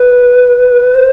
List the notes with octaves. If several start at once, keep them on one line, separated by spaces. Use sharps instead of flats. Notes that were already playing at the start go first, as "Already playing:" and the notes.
Already playing: B4
C5